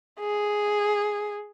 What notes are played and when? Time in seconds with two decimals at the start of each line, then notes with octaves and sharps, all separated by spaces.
0.20 G#4